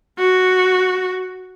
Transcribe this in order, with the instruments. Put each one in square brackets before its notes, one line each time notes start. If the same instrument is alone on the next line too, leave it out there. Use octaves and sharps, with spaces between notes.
[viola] F#4